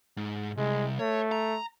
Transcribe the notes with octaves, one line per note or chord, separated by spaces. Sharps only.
G#2
C2 G#3
A3 C#5
A#5